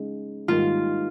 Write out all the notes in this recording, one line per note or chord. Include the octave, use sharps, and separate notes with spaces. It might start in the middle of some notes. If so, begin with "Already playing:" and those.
Already playing: C#3 G#3 D#4
G#2 D#3 G3 A#3 D#4 F4